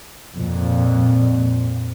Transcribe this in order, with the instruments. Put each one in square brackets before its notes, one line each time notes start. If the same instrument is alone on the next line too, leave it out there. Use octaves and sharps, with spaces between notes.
[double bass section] F2 A#2